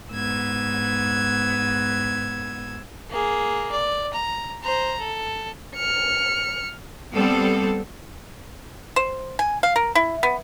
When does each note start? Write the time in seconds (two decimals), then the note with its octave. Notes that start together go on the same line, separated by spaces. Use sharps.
0.12 G#2 B3 E6 G#6
3.10 A#3 G#4
3.71 D5
4.13 A#5
4.62 C5 A#5
5.00 A4
5.76 F6 C#7
7.14 G3 B3 C4 A4
8.96 C5
9.39 G#5
9.63 F5
9.76 A#4
9.95 E4
10.23 B3